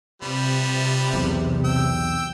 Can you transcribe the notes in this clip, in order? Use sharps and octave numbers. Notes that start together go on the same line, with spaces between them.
C3 F3 G3 B4
B1 E2
G5 E6